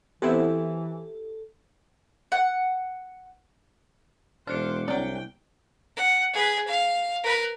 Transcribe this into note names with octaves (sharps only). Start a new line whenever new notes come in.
E3 B3 C4 E4 G4 A4
F#5
E1 D4 C5 D6 F6 F#6 C#7
C2 F#3 A#3 C4 D5 G5
F#5
G#4 B4
F5
A#4 B4